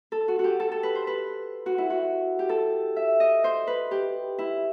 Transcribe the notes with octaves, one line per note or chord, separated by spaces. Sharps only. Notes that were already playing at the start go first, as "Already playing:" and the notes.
A4
F#4
F#4
G4
A4
A4
B4
C5
B4
F#4
E4
F#4
G4
A4
E5
D#5
C5
B4
G4
E4